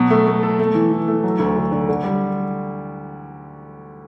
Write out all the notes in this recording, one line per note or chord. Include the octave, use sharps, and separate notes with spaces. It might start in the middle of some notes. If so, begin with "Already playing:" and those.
Already playing: B2 F#3
A3
A3
A4
A3
E3
E3
A3
F#3
D2
D3
D3
D3
G3